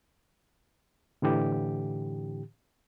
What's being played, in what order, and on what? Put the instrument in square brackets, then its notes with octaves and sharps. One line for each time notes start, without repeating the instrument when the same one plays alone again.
[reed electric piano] A2 D3 E3 G4